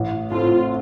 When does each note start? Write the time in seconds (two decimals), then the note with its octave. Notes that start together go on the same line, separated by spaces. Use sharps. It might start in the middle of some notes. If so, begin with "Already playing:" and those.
Already playing: A1
0.31 A2 A3 C4 F4